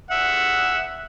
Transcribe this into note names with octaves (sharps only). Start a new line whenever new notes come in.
E5 F#5